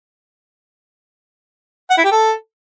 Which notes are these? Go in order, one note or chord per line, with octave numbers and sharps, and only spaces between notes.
F#5
E4
G4
A4